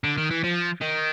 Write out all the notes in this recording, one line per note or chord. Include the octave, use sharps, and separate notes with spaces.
D3
D#3
E3
F3
D#3